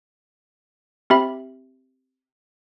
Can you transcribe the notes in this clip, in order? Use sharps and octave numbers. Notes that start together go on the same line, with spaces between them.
C4 G4 E5 B5